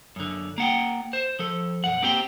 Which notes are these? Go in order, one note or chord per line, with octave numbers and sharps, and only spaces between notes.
F#2 D3
A#3 F#5 G5
C5
F3 A4
B1 F#2 F#5
A#3 C4 G4 G5